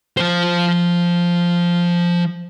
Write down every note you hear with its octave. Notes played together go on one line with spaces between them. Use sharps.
F3 C5